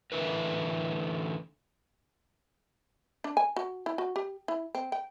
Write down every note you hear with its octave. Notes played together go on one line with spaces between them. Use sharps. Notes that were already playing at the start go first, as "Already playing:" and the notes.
D3 E3 A3 E4 A#4 B4
D4
G#5
F#4
E4
F#4
G4
E4
C4
G5